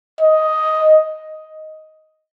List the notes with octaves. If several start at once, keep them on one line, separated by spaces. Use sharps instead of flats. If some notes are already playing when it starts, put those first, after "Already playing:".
D#5